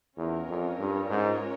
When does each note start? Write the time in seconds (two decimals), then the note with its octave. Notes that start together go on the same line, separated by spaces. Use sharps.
0.17 E2 C#4 F4 A#4 C#5
0.48 F2
0.79 G2
1.10 G#2